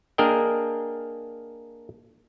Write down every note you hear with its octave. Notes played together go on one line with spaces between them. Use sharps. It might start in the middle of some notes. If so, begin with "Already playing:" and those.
A#3 D4 G#4 A#4 D#5 G5